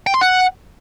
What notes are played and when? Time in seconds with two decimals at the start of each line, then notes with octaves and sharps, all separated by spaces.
0.07 G5
0.14 C6
0.21 F#5